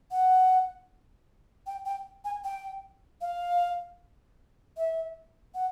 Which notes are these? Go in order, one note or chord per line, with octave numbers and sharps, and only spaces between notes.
F#5
G5
G5
G#5
G5
F5
E5
F#5